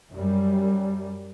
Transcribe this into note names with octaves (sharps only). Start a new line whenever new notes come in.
F#2 G3